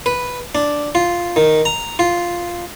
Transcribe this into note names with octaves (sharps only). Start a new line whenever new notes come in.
B4
D4
F4
D#3
A#5
F4